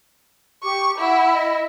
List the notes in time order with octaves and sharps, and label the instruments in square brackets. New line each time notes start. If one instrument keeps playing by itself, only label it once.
[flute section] G4 D6 [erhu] C#6
[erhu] E4 [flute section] F#5
[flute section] D#5